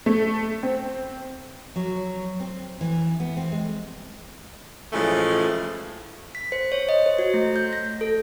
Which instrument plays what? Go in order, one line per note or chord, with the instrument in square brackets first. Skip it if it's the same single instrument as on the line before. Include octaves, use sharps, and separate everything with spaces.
[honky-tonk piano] A3
C4
[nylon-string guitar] F#3
C4
E3
B3
C4
G#3
[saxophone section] A2 C#3 E3 F3 G#3 A3
[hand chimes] B6
C5
C#5
D#5
C5
F#4
A3
G6
A#6
A4